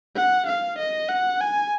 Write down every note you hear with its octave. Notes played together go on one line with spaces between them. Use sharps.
F#5
F5
D#5
F#5
G#5